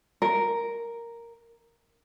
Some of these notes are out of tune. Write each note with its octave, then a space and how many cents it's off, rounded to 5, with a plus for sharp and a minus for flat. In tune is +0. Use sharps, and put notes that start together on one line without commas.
A#4 +0